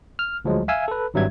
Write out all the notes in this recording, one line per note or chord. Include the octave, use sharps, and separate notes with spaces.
F6
D2 F3 F#3 G#3
E5 F5 G#5 E6
A4 B4
G#1 G2 F#3 G3 E5 G#6